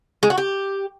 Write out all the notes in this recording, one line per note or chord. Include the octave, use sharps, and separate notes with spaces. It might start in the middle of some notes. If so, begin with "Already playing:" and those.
G#3
F#4
G4